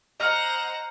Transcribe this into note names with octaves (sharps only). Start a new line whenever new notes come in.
C5 D#5 F#5 A#5 F6